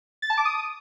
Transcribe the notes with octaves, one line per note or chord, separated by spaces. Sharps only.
A6
A5
D6
D#6